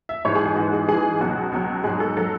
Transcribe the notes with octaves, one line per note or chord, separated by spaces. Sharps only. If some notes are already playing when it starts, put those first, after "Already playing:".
E5
G#2 E3 C#5
G#4
G#4
G#2 E3 F#4
G#4
G#2 E3 G#4
C#2 B2 F#3 F#4
C#2 B2 F#3
G#2 F#3 G#4
A4
F#3 A4